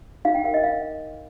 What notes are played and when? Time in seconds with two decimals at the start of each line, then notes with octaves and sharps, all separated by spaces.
0.25 D#4 F5
0.35 G5
0.44 A#4 F5
0.54 D#5
0.63 D#4 F5